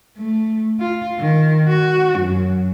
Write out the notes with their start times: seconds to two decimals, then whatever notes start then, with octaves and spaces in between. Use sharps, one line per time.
0.17 A3
0.80 F4
1.19 D#3
1.68 F#4
2.19 F#2